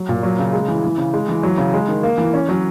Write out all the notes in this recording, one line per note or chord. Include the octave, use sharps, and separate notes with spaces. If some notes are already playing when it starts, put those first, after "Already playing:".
Already playing: F#3
A#2
F#3
C#3
G#3
E3
E3
C#3
G#3
E3
F#3
C#3
G#3
D#3
A#3
E3
C#4
F#3